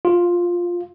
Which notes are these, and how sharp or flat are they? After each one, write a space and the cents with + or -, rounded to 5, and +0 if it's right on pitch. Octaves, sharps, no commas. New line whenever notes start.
F4 +5